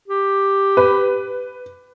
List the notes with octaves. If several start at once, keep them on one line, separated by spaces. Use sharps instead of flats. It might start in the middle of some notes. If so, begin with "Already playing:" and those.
G4
B4